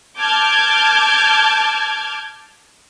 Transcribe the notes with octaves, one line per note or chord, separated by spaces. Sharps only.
A5 D6 F6 G6 G#6